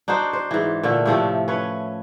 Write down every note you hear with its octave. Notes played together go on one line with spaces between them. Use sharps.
D4 D#4 F#4 C5
C5
G#2 E3
A#2 D3 A3
A2 C3 F3 A3
C#4 B4 C#5